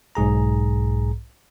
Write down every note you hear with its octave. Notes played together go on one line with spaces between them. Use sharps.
B1 G#2 G#4 A#5